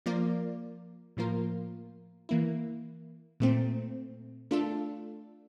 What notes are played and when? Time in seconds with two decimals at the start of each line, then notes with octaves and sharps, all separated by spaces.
0.06 F3 A#3 F4 A#4 D5
1.17 A2 F3 A#3 F4 A#4
2.29 E3 A#3 E4
3.40 A#2 A3 C4
4.51 A3 D4 F4 A4